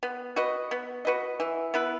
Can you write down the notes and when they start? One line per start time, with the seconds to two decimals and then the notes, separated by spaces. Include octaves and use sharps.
0.03 B3
0.36 F#4 B4 D#5
0.71 B3
1.05 F#4 B4 D#5
1.40 E3
1.74 B3 E4 B4